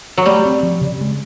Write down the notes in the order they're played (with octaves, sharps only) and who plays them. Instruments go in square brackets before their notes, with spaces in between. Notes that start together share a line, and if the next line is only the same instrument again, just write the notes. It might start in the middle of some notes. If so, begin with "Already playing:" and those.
[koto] F#3
[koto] G3 [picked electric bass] A3
[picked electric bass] C4
F3
C#3
G#3